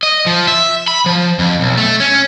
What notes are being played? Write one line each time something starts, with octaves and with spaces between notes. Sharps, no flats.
D#5
F3
E5
B5
F3
F2
B1
A3
C#4